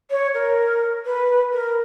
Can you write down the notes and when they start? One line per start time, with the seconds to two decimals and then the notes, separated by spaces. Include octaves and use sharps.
0.10 C#5
0.34 A#4
1.05 B4
1.53 A#4